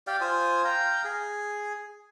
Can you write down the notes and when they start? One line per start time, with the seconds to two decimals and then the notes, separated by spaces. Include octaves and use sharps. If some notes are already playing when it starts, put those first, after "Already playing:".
0.07 G4 D5 F5 G5
0.21 F4 C5 G#5 D#6
0.64 F5 G5 A#5
1.05 G#4